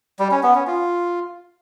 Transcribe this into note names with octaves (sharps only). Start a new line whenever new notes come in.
G3
C#4
B3
C#4
F4